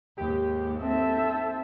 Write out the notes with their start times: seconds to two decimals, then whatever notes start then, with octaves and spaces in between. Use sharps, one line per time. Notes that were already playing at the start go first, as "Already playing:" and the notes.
0.18 D#2 G#2 G4
0.83 C4 A4 E5